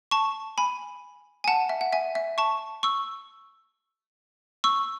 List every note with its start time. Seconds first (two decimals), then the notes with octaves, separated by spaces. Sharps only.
0.11 A5 C#6
0.58 G#5 B5
1.44 G#5
1.48 F#5 A5
1.69 E5
1.81 F#5
1.92 E5 G#5
2.15 E5
2.38 A5 C#6
2.83 C#6 E6
4.64 C#6 E6